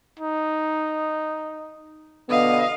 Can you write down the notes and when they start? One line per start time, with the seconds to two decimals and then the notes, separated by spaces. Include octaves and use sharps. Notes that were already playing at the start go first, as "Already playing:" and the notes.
0.20 D#4
2.29 B2 D3 B3 D#5 F5